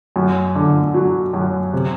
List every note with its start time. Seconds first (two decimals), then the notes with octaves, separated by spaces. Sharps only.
0.16 F#2
0.55 D3
0.94 F#3
1.33 F#2
1.73 C3